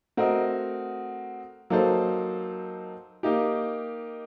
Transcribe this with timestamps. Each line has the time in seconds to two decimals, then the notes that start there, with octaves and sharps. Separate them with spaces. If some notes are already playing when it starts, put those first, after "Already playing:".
0.17 A3 C4 F#4 A#4 D#5
1.70 F#3 A#3 D#4 A4 C5
3.23 A#3 D#4 G4